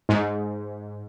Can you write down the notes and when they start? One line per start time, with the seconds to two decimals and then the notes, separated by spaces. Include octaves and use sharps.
0.09 G#2